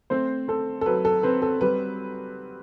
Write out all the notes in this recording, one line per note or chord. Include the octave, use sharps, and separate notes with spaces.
A3 C4 C5
C4 A4
A4
F#3 B4
A4
C4 B4
A4
G3 B4